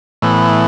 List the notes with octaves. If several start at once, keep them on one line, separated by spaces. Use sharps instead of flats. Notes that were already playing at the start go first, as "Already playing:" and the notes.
A2 E3 B3